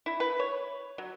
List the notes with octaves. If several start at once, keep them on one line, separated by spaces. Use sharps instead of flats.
E4
B4
C#5
F#3